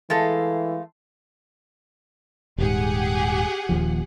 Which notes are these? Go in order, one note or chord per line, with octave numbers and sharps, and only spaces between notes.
E3 G#3 A3 A4 F5 A5 A6
D#1 G#2 G4 G#4 F#5
D#1 D#2 F3